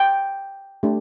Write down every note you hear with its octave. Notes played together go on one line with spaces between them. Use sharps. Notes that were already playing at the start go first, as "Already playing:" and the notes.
Already playing: G5
A3 D4 G4